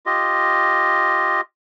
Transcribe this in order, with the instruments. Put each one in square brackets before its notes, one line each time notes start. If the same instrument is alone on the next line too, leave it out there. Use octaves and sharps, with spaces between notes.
[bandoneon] F4 G4 D#5